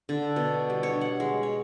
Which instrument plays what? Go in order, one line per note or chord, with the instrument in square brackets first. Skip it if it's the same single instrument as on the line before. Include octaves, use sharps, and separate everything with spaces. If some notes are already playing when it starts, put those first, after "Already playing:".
[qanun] D3
B2
G3
C#5
F#5
G#3
C#5